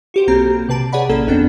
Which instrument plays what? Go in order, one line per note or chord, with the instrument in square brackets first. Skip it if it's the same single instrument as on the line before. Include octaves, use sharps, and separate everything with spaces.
[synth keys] F#4 G4 C5
B1 A#3 C4 A#5
C3 B4 A5 D7
G#4 C#5 D5 F#5 B5
A1 A#3 C#4 A4 A#5
G1 F2 B3 C4 D4